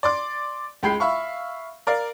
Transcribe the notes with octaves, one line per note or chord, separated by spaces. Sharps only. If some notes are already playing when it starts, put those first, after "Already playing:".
D5 C6 D6
C#2 G#3 G5 B5 C7
E5 F5 B5 C#6
A#4 D5 F5